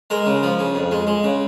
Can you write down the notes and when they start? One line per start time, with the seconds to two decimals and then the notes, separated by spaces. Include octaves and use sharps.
0.10 G#3 A#4
0.26 C#3
0.43 F3
0.59 C#3
0.75 F2
0.91 G#3
1.07 G#3
1.23 C#3